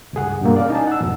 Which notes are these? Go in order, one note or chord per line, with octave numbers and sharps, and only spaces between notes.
C#2 G2 G#4 F#5
G2 B2 A#3
C#4 D5 F5
D#4 G#5 A5
F#5 E6
F2 G#2 B2